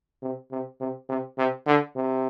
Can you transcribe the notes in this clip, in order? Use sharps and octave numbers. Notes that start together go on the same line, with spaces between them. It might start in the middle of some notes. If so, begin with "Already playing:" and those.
C3
C3
C3
C3
C3
D3
C3